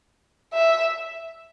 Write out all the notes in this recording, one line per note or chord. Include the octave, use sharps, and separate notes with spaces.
E5